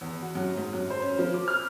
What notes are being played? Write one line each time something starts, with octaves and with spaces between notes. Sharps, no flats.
E2
F#4
F#2
G#2
F#2
C5
C#4
F3
D6
F6